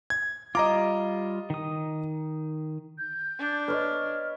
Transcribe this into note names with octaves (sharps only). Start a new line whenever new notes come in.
G#6
G3 F4 D#5 A#5 D6
D#3 D#6
G6
D4
B4 C#5 D#5 F6